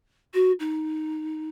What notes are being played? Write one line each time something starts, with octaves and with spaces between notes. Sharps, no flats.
F#4
D#4